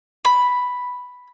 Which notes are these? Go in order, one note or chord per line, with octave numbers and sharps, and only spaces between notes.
B5